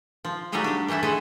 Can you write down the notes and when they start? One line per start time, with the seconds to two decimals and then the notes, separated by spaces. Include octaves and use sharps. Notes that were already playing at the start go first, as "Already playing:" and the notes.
0.25 F3
0.52 F#3 G3 A3 D#4 G4 G#4
0.64 D4 G4
0.88 E3 G3 A3 E4 E5
1.03 G#3 A3 B3 E4 G#4 A4